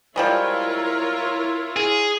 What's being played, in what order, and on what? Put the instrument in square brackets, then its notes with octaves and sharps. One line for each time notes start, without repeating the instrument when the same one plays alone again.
[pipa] F3 G3 G#3 [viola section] E4 F4 C#5 [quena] A#4
[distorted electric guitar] G#4